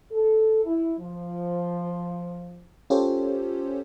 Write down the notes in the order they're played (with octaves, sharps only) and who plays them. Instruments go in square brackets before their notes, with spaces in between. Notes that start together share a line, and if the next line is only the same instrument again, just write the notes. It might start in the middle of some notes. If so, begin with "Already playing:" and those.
[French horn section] A4
E4
F3
[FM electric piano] C#4 F4 G4 A4 C5 C#5